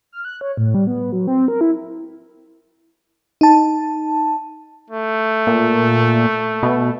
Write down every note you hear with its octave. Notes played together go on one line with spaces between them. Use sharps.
F6
F#6
C#5
A2
G3
B3
F#3
C4
A#4
E4
D#4 A5
A3
A#2
B2